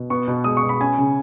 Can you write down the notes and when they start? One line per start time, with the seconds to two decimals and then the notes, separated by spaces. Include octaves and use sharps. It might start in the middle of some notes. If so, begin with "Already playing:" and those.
Already playing: B2
0.10 B3 C#6
0.28 B2
0.44 G#3 D#6
0.57 C#6
0.63 B2
0.69 B5
0.80 C#4 G#5
0.98 C#3